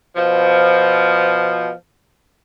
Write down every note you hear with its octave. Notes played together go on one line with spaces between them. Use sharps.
B2 F3